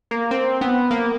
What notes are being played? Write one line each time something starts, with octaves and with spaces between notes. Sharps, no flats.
A#3
C4
B3
A#3